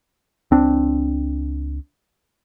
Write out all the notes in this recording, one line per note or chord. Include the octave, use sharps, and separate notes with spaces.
C#2 C4 D4